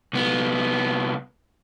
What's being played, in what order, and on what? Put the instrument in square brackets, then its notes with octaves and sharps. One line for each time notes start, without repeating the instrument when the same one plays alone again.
[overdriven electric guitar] C2 B3